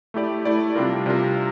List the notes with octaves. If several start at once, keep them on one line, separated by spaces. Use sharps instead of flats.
A3 E4 G4 D5
A3 E4 G4 D5
C3 G3 D4 F4 A#4
C3 G3 D4 F4 A#4